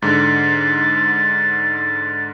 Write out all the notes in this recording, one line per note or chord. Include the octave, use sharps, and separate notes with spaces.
G#2 D3 A6